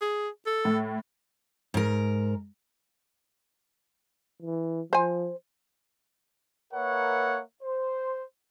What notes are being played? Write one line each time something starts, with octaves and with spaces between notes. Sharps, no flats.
G#4
A4
A2
G#2 A#4
E3
F3 C5 G#5
A#3 A#4 B4 C#5 E5 F#5
C5